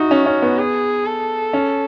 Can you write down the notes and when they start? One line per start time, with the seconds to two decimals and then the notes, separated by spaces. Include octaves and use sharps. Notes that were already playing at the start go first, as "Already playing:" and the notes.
Already playing: D#4 E4 F#4
0.11 C#4
0.26 C#4
0.42 B3
0.59 G#4
1.05 A4
1.53 C#4